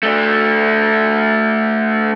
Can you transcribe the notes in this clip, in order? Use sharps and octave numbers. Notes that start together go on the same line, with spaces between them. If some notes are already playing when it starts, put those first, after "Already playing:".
A3 D4